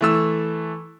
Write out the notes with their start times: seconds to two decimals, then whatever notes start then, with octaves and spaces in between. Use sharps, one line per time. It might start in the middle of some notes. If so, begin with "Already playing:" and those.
0.01 E3 A3 E6